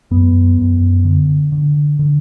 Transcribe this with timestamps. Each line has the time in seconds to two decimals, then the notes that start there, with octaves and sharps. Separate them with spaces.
0.11 F#2 B3
0.58 F#2
1.04 D3
1.52 D3
1.99 D3